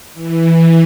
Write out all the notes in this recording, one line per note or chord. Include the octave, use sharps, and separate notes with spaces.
E3